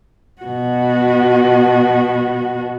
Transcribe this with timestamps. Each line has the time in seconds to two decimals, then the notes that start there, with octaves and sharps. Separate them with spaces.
0.42 B2 F#4